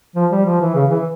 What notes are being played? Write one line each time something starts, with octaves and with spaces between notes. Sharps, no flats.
F3
G3
F3
E3
C#3
E3